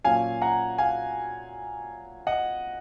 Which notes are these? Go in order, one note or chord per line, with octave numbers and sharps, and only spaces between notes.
A#2 F#3 C#4 F5 G#5
F#5 A#5
F5 G#5
D#5 F#5